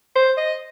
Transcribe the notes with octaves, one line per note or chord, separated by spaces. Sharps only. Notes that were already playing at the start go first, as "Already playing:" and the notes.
C5
D#5